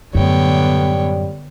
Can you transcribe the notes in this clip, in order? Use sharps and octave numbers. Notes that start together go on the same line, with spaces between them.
F#2 A2 D3 G3 B3 C#5 G5